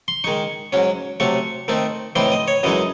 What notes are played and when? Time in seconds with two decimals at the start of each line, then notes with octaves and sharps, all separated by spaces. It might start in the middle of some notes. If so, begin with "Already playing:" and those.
0.08 C6
0.24 D#3 G#3 D#4 C#6
0.73 G#2 F#3 C#4
1.20 C3 F#3 A3 C#6
1.68 D#3 A3 C4 D#4
2.16 A2 E3 C4 D#4 C6
2.32 D#5
2.48 C#5
2.63 F#2 E3 G#3 D#4 D#5